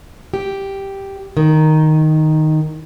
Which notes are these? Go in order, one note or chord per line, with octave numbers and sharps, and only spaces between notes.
G4
D#3